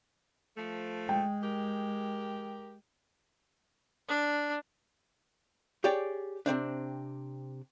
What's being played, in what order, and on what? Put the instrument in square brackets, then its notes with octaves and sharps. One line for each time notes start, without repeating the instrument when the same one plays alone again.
[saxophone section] F3 A3
[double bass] G#3 [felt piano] G5
[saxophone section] G4 A#4
[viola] D4
[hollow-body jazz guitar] G4 G#4 C#5 D5 G5
C3 A#3 C4 D4